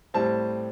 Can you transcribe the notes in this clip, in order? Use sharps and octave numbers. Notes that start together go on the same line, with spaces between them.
A2 G3 C4 A5